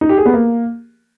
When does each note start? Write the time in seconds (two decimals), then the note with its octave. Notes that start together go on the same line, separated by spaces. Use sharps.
0.01 D#4
0.09 G4
0.17 G#4
0.26 B3
0.34 A#3